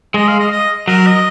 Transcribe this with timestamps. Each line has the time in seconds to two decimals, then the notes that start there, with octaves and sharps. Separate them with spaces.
0.14 G#3 D#5
0.28 F5
0.40 D#5
0.52 D#5
0.88 F#3 A#4
1.07 D#5